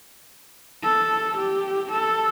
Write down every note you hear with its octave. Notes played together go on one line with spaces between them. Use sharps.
A4
G4
A4